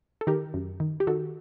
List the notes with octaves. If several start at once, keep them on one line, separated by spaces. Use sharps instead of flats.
A4
D#3 G4 A#4
F#2
D#3
G4
D#3 F#4 A4